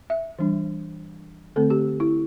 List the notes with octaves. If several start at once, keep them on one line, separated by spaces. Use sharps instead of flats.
E5
E3 G3 D4
D3 A3 C4 A4
G4
E4